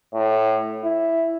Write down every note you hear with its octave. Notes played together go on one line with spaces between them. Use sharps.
A2
E4